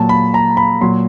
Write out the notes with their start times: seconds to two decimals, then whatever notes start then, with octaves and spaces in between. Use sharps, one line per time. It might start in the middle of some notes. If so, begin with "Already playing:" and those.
Already playing: A#2 F#3 A5
0.09 B5
0.34 A#5
0.57 B5
0.81 A#2 F#3 C6